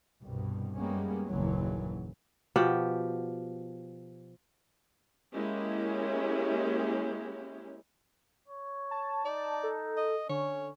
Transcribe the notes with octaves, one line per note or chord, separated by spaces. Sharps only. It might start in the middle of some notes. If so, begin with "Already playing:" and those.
C2 G2 B2
F#2 G3 G#3 A#3 B3 C#4
F#1 D#2 A#2 E3 F#3
B2 F3 G4 F#5
G#3 A#3 C#4 E4 G4
C#5
A5
D#4 D5
A4
D#5
D3 C#4 C#5